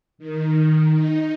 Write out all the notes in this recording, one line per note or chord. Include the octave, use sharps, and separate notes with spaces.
D#3
D#4